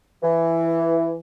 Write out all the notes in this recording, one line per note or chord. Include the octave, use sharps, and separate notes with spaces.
E3